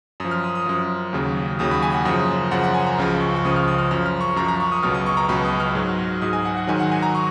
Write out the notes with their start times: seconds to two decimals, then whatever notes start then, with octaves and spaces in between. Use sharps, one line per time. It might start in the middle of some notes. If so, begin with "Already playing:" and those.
0.20 F#2 F3 D#6
0.31 F6
0.44 D#6
0.55 D#6
0.66 F#2 F3
1.13 D#2 C#3 F#3
1.59 D#2 C#3 F#3 D#6
1.71 B5
1.82 G#5
1.94 F#5
2.05 F#2 C#3 F3 D#6
2.51 F#2 C#3 F3 F#5
2.63 F#5
2.74 G#5
2.87 A#5
2.98 C#2 C#3 F3
3.20 C#6
3.36 C#6
3.45 C#2 C#3 F3 D#6
3.56 F6
3.68 D#6
3.78 F6
3.91 F#2 F3 F6
4.06 F6
4.21 C#6
4.36 F#2 F3 A#5
4.48 A#5
4.60 C#6
4.72 D#6
4.83 C#2 B2 F#3 F6
4.94 D#6
5.06 C#6
5.17 A#5
5.29 C#2 B2 F#3 B5
5.45 D#6
5.60 F6
5.75 G#2 F#3
6.22 G#2 F#3 D#6
6.33 G#5
6.45 F#5
6.57 F#5
6.67 G#2 D#3 F#3 G#5
6.80 F#5
6.92 G#5
7.02 A#5
7.15 C#6